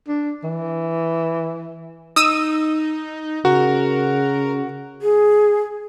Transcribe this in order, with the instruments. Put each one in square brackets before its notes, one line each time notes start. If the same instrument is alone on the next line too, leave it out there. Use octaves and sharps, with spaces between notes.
[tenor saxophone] D4
E3
[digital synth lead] D#4 [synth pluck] D#6 E6 D#7
[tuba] C#3 [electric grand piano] F#4 [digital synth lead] A#4
[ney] G#4